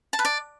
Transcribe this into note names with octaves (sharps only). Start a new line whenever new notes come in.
A5
B4
D5